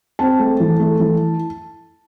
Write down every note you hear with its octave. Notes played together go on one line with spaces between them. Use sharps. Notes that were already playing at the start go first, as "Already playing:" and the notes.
C4 A5
A3
E3
A3
E3